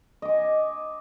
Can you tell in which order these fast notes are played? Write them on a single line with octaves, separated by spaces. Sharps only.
D#5 D6 G#5